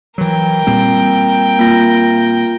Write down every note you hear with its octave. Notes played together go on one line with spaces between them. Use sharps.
E3 F#3 A#4 G5
A#2 G3 C4
A#3 F4 A#6